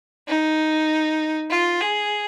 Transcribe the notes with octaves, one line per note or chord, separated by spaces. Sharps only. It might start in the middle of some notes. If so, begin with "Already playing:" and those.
D#4
F4
G#4